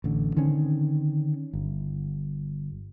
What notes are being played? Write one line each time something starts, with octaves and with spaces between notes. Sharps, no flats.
A1 D3
D3 D#3 C4 C#4
G1